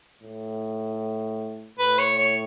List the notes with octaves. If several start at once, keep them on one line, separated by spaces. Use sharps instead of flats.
A2
A2 B4
C#5
C#5